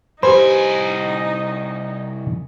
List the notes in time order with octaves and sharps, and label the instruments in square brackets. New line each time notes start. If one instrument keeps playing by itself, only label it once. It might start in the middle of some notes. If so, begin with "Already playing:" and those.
[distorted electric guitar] C2 G#5 [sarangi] D#4 [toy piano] G4 B4 B5 [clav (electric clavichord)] C5